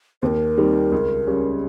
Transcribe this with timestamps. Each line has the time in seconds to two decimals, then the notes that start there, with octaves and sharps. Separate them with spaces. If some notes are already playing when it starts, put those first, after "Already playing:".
0.22 D#2 A#4 C5
0.58 D#3 G3 C4
0.92 C#2
1.27 C#3 G3 C#4